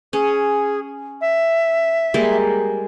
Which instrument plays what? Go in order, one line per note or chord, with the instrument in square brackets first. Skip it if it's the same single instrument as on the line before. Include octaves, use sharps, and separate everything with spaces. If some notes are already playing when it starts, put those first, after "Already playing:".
[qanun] C#4 [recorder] G#4
[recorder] E5
[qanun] G3 G#3 A#3